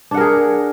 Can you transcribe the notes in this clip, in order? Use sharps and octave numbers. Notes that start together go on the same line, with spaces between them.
D4 G#4 A#4 F#5